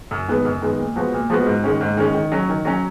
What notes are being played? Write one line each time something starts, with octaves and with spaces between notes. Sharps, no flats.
F#2
D#3 G#3 B3
F#2
D#3 G#3 B3
A#2
F3 G#3 B3 F#4
A#2
F3 G#3 B3 F#4
G#2
D#3 G#3 C#4
G#2
D#3 G#3 C#4
D#3
F#3 C#4
D#3
F#3 C#4